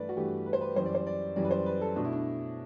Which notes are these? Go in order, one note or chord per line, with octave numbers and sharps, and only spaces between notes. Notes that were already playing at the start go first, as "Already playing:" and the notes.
Already playing: G2 E3 A3 B4 D5
F#4
G2 E3 A3 G4
B4
C5
B4
F#2 E3 G3 C5
D5
C5
D5
F#2 E3 G3 D5
B4
C5
B4
A4
B2 A3 D4
E4
D4